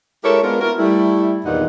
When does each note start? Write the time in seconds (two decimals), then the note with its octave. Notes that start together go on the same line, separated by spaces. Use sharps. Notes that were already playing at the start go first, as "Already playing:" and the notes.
0.24 G#3 E4 G4 A4 A#4 C#5
0.43 G#3 B3 D4 F4 A#4
0.60 B3 E4 F#4 A#4
0.78 G3 A3 E4
1.45 E2 G2 A#2 D#3 D#4 F#5